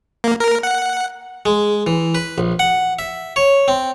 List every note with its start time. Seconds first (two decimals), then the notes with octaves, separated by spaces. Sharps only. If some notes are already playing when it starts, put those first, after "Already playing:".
0.24 A#3
0.40 A#4
0.63 F#5
1.46 G#3
1.87 E3
2.15 B4
2.38 A#1
2.59 F#5
2.99 E5
3.36 C#5
3.68 C4